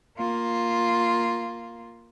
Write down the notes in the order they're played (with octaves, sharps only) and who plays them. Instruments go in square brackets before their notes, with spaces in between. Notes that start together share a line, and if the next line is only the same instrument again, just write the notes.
[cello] A#3 F4